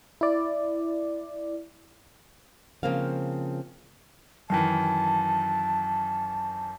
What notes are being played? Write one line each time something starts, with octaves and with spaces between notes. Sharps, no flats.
E4 D5
C#3 F3 A#3 C4 F5
F#2 D#3 E3 A5